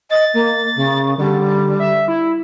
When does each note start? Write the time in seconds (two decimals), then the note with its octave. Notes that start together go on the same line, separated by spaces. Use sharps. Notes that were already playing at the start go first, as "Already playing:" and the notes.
0.10 D#5 A6
0.34 A#3
0.76 C#3
1.18 D3 G3
1.80 E5
2.08 E4